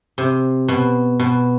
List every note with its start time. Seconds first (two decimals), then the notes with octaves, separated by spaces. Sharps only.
0.18 C3
0.68 B2
1.20 B2